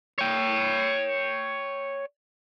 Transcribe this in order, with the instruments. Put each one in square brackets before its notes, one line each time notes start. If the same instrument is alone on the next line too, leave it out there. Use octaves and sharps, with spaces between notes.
[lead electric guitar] C#5 G5